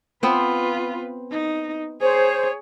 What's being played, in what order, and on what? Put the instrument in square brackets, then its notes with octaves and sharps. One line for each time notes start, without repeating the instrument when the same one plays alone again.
[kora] B3 C4 [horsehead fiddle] F4 B4
[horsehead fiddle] D#4
[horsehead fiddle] G#4 C#5 [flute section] C5